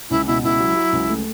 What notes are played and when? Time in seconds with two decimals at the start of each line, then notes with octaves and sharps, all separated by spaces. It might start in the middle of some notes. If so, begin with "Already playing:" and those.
0.10 C#2 E4
0.27 B2 E4
0.43 C#2 E4
0.59 F#3
0.76 F#3
0.93 C#2
1.10 A3